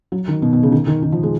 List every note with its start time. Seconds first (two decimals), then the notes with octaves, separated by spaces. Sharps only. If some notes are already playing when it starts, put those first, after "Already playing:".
0.12 F#3
0.28 D#3
0.42 B2
0.53 B2
0.63 C#3
0.72 D#3
0.87 D#3
1.02 D#3
1.12 F3
1.23 G#3